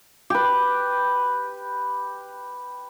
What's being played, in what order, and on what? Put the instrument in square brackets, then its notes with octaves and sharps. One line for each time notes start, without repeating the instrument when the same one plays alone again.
[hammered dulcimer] G4 B4